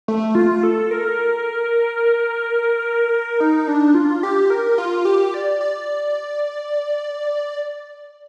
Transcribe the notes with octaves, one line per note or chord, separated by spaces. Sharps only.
A3
F4
A4
A#4
D#4
D4
F4
G4
A#4
F4
G4
D5
D5